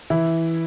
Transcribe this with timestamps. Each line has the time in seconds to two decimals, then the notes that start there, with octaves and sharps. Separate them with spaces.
0.10 E3 E4